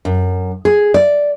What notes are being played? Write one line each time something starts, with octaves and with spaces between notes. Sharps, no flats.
F#2
G#4
D5